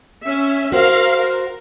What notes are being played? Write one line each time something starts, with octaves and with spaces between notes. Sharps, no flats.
C#4 E5
F#4 A#4 C5 F5
A#4